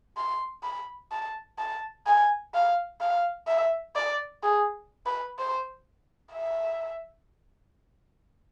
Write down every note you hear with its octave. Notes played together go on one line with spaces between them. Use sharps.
C6
B5
A5
A5
G#5
F5
F5
E5
D5
G#4
B4
C5
E5